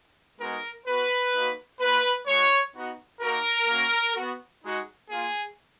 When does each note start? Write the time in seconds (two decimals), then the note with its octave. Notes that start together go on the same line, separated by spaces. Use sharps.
0.39 G#3 B3 D#4 F#4 A#4
0.86 B3 F#4 B4
1.33 A#3 D#4 F#4
1.80 A#3 F4 B4
2.27 G#3 D#4 F#4 C#5
2.74 B3 D#4 F#4
3.21 A#3 D#4 F#4 A#4
3.68 A#3 C#4 F#4
4.16 B3 F#4
4.63 G#3 D#4 F#4
5.10 A#3 F4 G#4